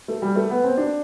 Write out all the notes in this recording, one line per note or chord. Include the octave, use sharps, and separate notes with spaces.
A3
G3
A3
B3
C4
D4